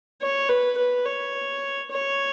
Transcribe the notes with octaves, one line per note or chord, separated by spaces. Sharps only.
C#5
B4
B4
C#5
C#5